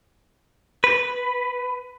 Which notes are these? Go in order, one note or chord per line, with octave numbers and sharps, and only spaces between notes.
B4